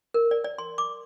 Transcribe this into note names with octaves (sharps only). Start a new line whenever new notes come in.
A#4
D5
D5
C6
D6